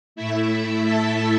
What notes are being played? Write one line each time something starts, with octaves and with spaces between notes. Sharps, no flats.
A2 A3 E4 E5
E4 E5
A4 A5